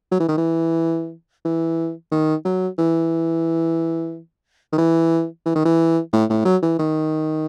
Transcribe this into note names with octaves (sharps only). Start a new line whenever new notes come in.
F#3
E3
D#3
E3
E3
D#3
F#3
E3
D#3
E3
E3
D#3
E3
A2
A2
F#3
E3
D#3